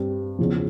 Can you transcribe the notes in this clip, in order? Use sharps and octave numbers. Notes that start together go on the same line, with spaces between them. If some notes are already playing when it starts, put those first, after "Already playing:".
Already playing: G2 G3 C4 G4
E2 C#3 F3